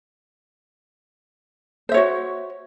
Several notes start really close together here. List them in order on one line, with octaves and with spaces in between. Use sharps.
C5 E5 C#5 F#4